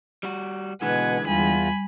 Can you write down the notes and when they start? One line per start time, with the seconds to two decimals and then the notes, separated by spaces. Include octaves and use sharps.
0.23 G3 F#4
0.82 B2 D3 E3 G#3 B4 F#5 G#5 G#6
1.26 E2 G3 F4 G#5 B5